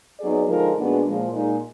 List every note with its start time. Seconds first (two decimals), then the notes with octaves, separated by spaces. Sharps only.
0.19 F#3 B3 D#4 G#4 D5
0.47 D3 F3 G#3 D#4 A#4
0.76 A#2 G#3 B3 D4 F#4
1.04 A#2 F3 G#3
1.32 A#2 G#3 D#4